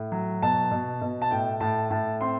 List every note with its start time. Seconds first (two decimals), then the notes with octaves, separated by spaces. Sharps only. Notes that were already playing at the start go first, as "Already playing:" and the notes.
Already playing: A2
0.12 F#3
0.42 B2 A5
0.71 B2
1.02 B2
1.22 A5
1.31 A2 G5
1.61 A2 A5
1.90 A2 A5
2.21 C4 C6